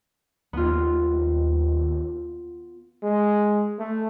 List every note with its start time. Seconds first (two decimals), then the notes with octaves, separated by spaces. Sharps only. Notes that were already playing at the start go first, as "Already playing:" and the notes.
0.53 D#2 B3 F4
3.03 G#3
3.79 A3